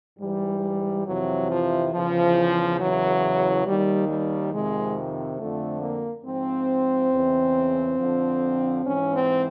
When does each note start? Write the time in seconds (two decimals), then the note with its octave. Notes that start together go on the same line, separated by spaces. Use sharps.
0.19 G#2 E3 G3
1.06 F2 C3 E3 F#3
1.49 F3
1.92 E2 C#3 E3 F3
2.79 E2 C#3 E3 F#3
3.65 D#2 D#3 G3
4.09 G3
4.52 F2 C3 D#3 G#3
5.38 F2 D3 F3 A3
5.82 A#3
6.25 G#2 F3 C4
7.11 E2 C#3 E3
7.97 F2 D3 F3
8.84 G#2 E3 C#4
9.13 C4